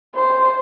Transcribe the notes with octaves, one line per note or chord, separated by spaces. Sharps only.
C5